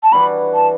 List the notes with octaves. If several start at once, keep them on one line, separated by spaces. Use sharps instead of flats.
A5
E3 G3 D4 F#4 B5
A5